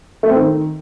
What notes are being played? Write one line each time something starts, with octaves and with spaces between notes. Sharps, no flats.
A3
C4
D#3